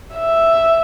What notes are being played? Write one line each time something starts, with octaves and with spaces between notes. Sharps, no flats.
E5